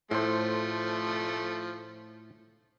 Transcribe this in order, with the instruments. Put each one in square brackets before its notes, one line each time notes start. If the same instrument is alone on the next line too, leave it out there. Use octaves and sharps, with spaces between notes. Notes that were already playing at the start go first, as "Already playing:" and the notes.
[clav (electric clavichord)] A2 C5 [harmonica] F3 A3